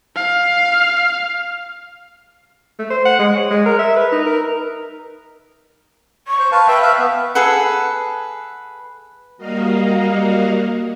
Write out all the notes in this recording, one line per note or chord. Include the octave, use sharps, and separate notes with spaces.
F5
A3
C5
F#5
G#3
C#5
G#3
A#4
E5
B4
D#4
A#4
C#6
C5
B4 F5 A5
B4 E5 G5
E5 F5
B3
G#4 A4 B4 F#5
G3 A#3 F#4 A#4 D#5 F5